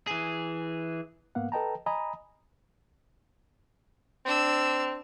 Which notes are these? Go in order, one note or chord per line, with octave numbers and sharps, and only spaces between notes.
E3 G#4
G#2 A#3 B3 F5 F#5
A4 B4 D#5 G5 A5 A#5
D#5 G#5 A#5 B5 D#6
C4 D4 E6